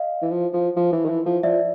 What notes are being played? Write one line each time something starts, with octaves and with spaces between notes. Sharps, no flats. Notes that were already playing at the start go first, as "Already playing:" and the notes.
Already playing: D#5 F5
E3
F3
F3
F3
E3
D#3
E3
F3
F3 D5 E5